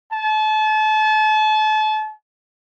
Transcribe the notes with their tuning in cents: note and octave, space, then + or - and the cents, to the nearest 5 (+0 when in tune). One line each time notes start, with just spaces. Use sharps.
A5 -35